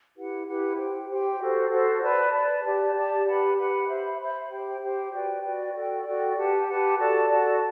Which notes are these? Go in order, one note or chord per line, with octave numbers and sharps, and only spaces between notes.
E4 G4 B4 F#5
E4 G4 B4 F#5
G4 C5 G5
G4 C5 G5
F#4 A4 C5
F#4 A4 C5
B4 D5 A5
B4 D5 A5
G4 D5 A5
G4 D5 A5
G4 B4 F#5 B5
G4 B4 F#5 B5
C5 E5 B5
C5 E5 B5
G4 C5 G5
G4 C5 G5
F#4 B4 D5 G5
F#4 B4 D5 G5
F#4 A4 D5 G5
F#4 A4 D5 G5
G4 B4 F#5 A5
G4 B4 F#5 A5
F#4 A4 D5 A5
F#4 A4 D5 A5